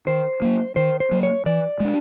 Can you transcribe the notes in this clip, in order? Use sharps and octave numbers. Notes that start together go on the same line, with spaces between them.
D#3 C5
F#3 A#3
D#3 C5
C5
F#3 A#3
C#5
E3 D5
G#3 B3 D4